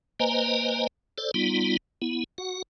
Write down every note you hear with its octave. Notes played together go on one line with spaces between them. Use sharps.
A#3 B4 C5 D#5 G#5 A#5
A4 C5 D5
G3 B3 D#4 F4
B3 E4
F#4 F#5